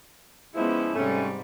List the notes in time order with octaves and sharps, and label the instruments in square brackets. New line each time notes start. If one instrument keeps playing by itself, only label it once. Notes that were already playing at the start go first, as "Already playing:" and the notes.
[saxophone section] F3 E4 [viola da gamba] G#3 B3 C#4
[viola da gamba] G#2 C3 G3 [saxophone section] A3 C#4